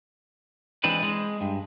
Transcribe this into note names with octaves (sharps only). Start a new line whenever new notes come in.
E3 G#3 C4 D4 B4
G#3
G2